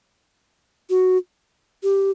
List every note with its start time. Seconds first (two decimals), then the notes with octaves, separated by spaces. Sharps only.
0.90 F#4
1.83 G4